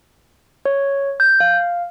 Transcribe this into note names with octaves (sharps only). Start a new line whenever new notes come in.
C#5
G6
F5